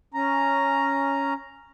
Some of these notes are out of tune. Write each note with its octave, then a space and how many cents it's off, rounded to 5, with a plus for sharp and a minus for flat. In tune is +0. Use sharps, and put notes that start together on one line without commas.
C#4 +0 A#5 +0